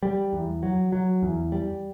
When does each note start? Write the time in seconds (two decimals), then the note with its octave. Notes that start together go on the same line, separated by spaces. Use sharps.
0.03 G3
0.33 E2
0.63 F#3
0.92 F#3
1.22 E2
1.52 G3